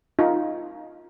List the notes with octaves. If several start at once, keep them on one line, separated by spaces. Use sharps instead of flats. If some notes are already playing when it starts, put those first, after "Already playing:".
D#4 F4